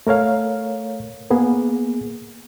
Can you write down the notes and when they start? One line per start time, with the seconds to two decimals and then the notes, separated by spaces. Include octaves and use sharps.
0.07 A3 A#4 C#5 F5
1.30 A#3 B3 G#4